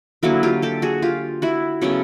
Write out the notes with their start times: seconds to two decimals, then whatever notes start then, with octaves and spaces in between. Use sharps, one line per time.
0.23 D3 F#3 A#3 E4 F#4
0.43 F4 G4
0.62 G4 A4
0.82 F#4 G#4
1.02 F4 G4
1.42 E4 F#4
1.82 C#3 F#3 A3 B3 C#4